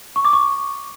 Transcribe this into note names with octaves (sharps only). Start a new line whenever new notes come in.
C#6
D6
C#6